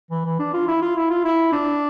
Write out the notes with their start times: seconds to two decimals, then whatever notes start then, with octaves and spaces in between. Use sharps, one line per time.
0.10 E3
0.25 E3
0.39 D4
0.53 F4
0.68 E4
0.82 F4
0.96 E4
1.10 F4
1.24 E4
1.52 D4